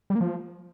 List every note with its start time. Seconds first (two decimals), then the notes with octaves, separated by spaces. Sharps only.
0.10 G3
0.15 A#3
0.21 F3